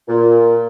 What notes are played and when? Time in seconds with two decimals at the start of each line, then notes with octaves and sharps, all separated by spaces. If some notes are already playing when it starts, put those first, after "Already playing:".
0.08 A#2